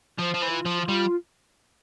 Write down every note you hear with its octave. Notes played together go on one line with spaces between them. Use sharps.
F3 C5
F3
E3
F4
F3
F4
G3